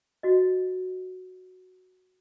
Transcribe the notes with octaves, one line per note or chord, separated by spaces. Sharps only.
F#4 D#5